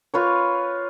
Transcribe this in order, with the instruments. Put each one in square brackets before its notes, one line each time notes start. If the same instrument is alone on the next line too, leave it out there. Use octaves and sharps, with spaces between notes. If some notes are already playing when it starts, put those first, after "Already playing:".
[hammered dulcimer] F4 B4 C#5